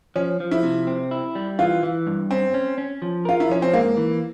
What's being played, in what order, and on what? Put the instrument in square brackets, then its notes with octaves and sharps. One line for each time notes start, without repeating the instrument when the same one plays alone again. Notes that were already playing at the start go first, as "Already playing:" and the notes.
[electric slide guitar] F3 [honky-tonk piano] C#4
[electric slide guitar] F3
[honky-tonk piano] E4
[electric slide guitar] C3
C4
E4
G3
[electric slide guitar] E3 [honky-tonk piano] F4
[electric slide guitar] E3
G2
[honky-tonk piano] C4 [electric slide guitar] C#4
[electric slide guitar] C#4
C#4
F3
[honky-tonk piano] F4 [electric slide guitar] A#4
[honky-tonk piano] E4
[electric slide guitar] F3 [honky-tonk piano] C#4
[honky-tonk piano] C4
[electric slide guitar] G#2 [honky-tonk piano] A#3
[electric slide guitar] E3